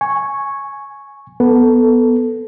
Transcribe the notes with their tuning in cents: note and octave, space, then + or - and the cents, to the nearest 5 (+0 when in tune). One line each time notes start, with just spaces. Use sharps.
G#5 +0 C#6 -5
B3 +0 A4 +0